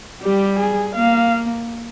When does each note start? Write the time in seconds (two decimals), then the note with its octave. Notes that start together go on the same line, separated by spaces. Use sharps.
0.22 G3 G4
0.60 G#4
0.96 A#3 F5